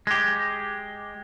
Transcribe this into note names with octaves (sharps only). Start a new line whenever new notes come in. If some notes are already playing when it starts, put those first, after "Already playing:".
G#3 G4